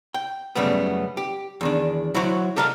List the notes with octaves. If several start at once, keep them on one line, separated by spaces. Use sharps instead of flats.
G5
F#2 C#3 G3 A3 B3
G4
E2 D#3 D4
F#3 E4 F#4 C5 C#5
G4 A4 A#4 D#5 F5